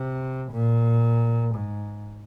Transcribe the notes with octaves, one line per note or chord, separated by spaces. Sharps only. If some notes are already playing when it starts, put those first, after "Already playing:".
Already playing: C3
A#2
G#2